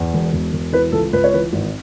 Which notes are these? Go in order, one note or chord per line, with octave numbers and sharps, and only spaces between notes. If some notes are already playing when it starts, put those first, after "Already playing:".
Already playing: E2
E1
E1
E1
E3 B4
C#2 A4
C#2 B4
C#5
E3 B4
G#1